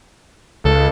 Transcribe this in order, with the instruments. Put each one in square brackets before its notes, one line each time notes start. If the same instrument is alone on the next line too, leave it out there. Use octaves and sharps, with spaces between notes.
[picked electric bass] C#2 [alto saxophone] A4